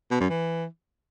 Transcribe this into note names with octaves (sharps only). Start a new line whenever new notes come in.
B2
F#2
E3